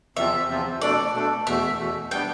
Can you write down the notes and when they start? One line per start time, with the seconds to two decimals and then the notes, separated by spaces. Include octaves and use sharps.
0.16 E2 C3 F3 C4 F4 E5
0.49 E2 C3 F3 C4 F4
0.81 B2 A3 D4 A4 D5
1.14 B2 A3 D4 A4
1.46 E2 B2 A3 E5
1.79 E2 B2 A3
2.11 G3 B3 D4 G5